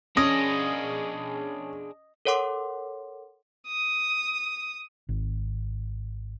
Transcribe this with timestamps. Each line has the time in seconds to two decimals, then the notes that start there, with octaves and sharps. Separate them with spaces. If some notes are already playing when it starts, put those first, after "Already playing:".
0.17 C#4 D4 G#4 D#5
2.25 A4 A#4 C#5 F#5 C6 D6
3.68 D#6
5.09 G#1